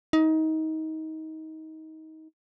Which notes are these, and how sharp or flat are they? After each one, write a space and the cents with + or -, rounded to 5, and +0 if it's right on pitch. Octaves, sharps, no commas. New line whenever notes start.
D#4 +25